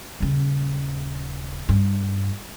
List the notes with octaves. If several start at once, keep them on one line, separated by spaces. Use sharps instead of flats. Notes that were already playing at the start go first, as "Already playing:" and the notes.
D#1 C#3
G2